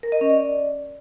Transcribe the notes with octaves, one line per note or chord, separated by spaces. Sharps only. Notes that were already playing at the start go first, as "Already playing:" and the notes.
A#4
D#5
C#4
D5